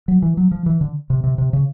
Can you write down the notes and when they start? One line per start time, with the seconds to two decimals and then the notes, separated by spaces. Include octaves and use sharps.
0.08 F#3
0.22 E3
0.37 F#3
0.52 F3
0.66 E3
0.81 D3
1.10 C3
1.24 C3
1.38 C3
1.53 C#3